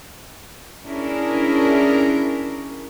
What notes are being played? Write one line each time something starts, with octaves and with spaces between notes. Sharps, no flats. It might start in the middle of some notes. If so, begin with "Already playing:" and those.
C#4 D4 E4 G#4 A#4